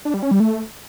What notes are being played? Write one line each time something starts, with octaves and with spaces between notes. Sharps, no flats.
D4
G3
C#4
G3
A3